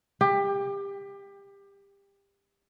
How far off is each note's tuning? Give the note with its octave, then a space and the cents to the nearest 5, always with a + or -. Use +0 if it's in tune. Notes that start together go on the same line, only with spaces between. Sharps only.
G4 +25